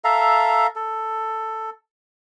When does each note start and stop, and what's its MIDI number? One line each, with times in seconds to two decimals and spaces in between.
0.04 0.67 69
0.04 0.67 76
0.04 0.67 77
0.04 0.67 82
0.76 1.70 69